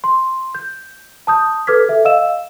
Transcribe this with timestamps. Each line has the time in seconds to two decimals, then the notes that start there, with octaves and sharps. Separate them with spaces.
0.04 C6
0.55 G6
1.27 A5 D#6 G6
1.67 A4 B4 D6 F6 G#6 B6
1.89 A4 E5
2.05 D#5 F5 E6 E7